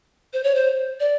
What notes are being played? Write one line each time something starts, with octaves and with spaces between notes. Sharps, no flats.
C5
C#5
C5
D5